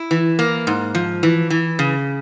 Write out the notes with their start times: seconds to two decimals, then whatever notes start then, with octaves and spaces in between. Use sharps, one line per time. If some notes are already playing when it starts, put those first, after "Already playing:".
Already playing: E4
0.11 E3
0.39 A#3
0.67 G#2
0.95 F3
1.23 E3
1.50 E3
1.79 C#3